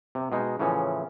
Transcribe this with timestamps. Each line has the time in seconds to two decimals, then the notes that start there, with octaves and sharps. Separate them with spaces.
0.15 C3
0.32 B2 G#3 D#4
0.60 A2 C#3 E3 F3 C#4